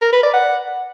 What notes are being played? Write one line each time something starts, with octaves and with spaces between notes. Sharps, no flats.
A#4
B4
D5
F#5